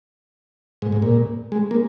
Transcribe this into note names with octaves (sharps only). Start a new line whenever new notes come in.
G#2
G#2
A#2
G#3
A#3